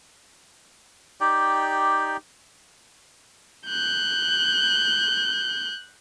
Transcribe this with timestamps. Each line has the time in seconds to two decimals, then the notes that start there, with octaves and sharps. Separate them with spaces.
1.21 D#4 G4 D5 G5
3.67 F#6 G6